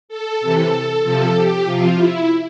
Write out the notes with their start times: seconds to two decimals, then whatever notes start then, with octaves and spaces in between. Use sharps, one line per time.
0.09 A4
0.41 C3 E3
1.03 C3 F3 A4
1.35 G4
1.65 C3 F3 F4
1.96 E4